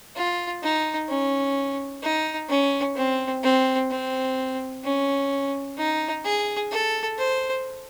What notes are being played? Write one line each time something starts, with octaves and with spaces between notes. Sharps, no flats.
F4
D#4
C#4
D#4
C#4
C4
C4
C4
C#4
D#4
G#4
A4
C5